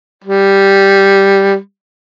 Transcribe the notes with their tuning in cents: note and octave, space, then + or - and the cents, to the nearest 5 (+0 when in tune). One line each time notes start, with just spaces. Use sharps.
G3 +0